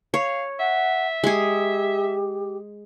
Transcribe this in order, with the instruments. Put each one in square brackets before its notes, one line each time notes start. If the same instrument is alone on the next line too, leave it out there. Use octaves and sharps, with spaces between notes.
[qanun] C#5 [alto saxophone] F5
[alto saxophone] E5 [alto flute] F#5
[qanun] G#3 G#4 [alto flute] G4